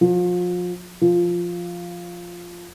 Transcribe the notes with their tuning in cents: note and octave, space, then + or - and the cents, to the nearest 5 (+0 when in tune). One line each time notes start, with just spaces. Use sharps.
F3 +35
F3 +0